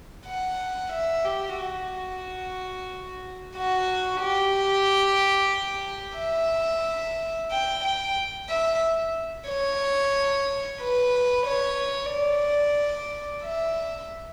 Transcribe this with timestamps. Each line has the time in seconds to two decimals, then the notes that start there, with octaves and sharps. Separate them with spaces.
0.27 F#5
0.92 E5
1.25 G4
1.58 F#4
3.56 F#4
4.21 G4
6.18 E5
7.51 G5
7.84 G5
8.50 E5
9.48 C#5
10.81 B4
11.46 C#5
12.12 D5
13.43 E5